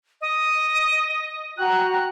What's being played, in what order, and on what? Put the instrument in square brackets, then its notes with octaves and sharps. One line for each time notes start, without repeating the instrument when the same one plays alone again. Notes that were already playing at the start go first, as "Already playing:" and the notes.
[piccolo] D#5
[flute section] F#4 G5 A#5 [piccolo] F#6